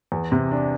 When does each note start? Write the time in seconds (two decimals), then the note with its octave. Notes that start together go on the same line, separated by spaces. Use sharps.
0.12 E2
0.32 C3
0.51 D4